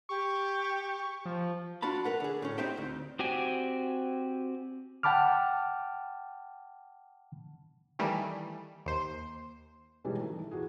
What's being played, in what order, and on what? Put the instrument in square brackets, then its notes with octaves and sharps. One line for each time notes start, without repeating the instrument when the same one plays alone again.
[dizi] G4 [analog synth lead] C#6
[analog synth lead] F3
[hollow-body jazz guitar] D4 F4 F#4 A5 B5
A#4 B4 F#5
D3 G#4
A2 C#4
C4 D#4 G4 C5 E5 G5
D2
[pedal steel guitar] C4 F#4 G4 D5 G#5
[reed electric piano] F#5 G5 A5 B5 D6 F6
[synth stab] D#3 E3 G3 A3
D#2 C5
[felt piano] B2 D#3 E3 G3 G#3 C#4
D#3 E3 A3
E2 F#4 G#4